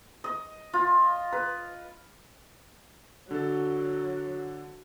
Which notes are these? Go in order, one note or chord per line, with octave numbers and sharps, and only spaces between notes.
D#5
F4
B4
D3 F#3 A4